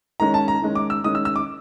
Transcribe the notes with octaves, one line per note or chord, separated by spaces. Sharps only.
D#3 G#3 C#4 A#5
A5
A#5
D#3 G#3 C#4
D6
E6
D#3 G#3 C#4 D#6
E6
E6
D6